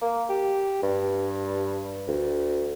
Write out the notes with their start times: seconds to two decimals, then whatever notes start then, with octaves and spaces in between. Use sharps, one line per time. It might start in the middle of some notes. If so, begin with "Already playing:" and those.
0.02 A#3
0.29 G4
0.83 G2
2.08 D2